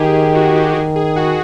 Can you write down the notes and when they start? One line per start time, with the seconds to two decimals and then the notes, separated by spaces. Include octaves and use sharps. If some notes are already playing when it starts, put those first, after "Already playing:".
Already playing: D#3 G4 G#4
0.15 G4
0.35 F#4
0.55 G4
0.75 D#3 G#4
0.96 G#4
1.16 F#4